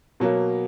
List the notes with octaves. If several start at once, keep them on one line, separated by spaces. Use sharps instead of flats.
B2 F#3 A#3